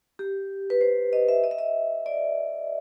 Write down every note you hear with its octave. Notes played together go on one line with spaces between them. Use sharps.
G4
B4
C5
D#5
E5
D#5
E5
D#5
D5